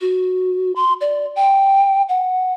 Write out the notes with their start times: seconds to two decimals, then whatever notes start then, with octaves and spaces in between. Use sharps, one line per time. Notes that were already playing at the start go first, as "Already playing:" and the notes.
0.01 F#4
0.76 C6
1.01 D5
1.36 G5
2.09 F#5